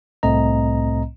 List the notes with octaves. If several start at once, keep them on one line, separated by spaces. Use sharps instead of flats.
C2 A2 A3 C4 D#5 A#5